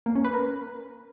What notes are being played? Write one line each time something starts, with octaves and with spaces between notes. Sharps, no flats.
A#3
C#4
B4
A#4